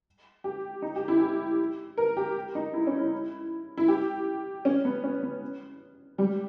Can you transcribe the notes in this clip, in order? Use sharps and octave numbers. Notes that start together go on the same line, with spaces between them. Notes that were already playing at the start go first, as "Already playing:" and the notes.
G4
D#4
G4
E4
G4
A#4
G4
D#4
E4
C#4
E4
E4
G4
C#4
B3
C#4
B3
G3